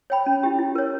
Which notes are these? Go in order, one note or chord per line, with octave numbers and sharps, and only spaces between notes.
C#5 G5 B5
C#4
E4 G4
E4
A#4 C#5